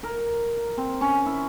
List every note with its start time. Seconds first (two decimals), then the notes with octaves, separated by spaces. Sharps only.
0.03 A#4
0.78 C4
1.01 C#4
1.26 E4